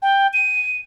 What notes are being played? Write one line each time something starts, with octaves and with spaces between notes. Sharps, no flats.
G5
D#7